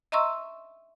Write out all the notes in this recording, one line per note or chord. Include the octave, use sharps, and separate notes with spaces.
D#5 E5 A#5 C6 C#6 E6